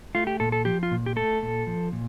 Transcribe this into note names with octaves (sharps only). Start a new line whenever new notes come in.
A3 F4
G4
A#2 A4
A4
F3 G4
F4
A#2
G4
A3 A4
A#2
F3
A#2